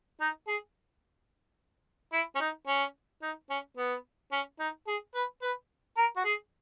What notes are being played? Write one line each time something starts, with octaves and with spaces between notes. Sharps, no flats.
D#4
G#4
E4
C#4
D#4
C#4
D#4
C#4
B3
C#4
D#4
G#4
B4
B4
A#4
F#4
G#4